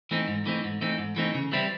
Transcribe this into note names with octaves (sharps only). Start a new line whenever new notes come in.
E3 A3 C4 D#4
G#2
E3 A3 C4 D#4
G#2
E3 A3 C4 D#4
G#2
E3 A3 C4 D#4
C#3
E3 G3 C4 E4